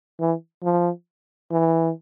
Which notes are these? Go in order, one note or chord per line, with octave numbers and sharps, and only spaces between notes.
E3
F3
E3